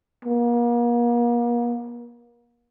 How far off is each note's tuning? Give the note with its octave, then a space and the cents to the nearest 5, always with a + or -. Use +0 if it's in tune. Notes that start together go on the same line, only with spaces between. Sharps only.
A#3 +40